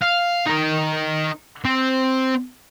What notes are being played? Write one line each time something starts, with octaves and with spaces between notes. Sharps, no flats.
F5
D#4 A#4
C4